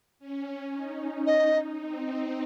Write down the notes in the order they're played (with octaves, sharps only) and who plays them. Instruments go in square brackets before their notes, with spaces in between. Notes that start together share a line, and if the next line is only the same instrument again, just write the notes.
[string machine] C#4
D#4
[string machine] D#4 [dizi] D#5
[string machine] C4